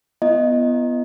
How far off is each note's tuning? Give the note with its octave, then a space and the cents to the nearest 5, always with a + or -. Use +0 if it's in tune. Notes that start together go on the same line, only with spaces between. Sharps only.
B3 +0 E4 +45 D#5 -5